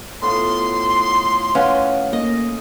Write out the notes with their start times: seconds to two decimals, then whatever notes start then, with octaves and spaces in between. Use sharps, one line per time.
0.22 A2 B3 F4 C6
1.55 C#4 B4 F5 F#5
2.13 A#3 D#5